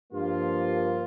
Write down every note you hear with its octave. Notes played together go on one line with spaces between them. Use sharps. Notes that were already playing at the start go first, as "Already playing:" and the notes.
G2 F3 A#3 F4